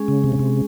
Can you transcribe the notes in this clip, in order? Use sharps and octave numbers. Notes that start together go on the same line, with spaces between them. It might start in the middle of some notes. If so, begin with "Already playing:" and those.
Already playing: G#3 C#4 G#4
C#3
C3
C#3
C3